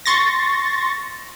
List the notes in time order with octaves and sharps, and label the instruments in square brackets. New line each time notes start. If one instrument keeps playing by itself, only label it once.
[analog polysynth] C6 C#6 A6 A#6